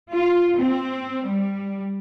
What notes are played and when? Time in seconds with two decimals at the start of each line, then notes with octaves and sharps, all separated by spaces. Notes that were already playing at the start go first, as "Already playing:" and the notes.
0.11 F4
0.55 C4
1.25 G3